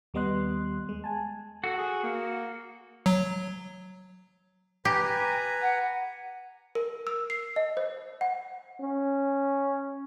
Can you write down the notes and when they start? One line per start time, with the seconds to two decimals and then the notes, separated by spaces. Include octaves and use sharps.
0.14 D#2 G3 B3 D#5 C6 F#6
0.89 G#3
1.04 G#5 A5
1.64 F#4 A4
1.78 G#4
2.03 A#3
3.06 F#3
4.85 G4 B4 G#5 A#5
5.62 F#5
6.75 A#4
7.07 E6
7.30 C7
7.56 D#5
7.77 C5
8.21 F#5
8.80 C#4